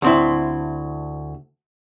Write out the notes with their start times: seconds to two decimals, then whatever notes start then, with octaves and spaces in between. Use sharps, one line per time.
0.02 D2 C4 E4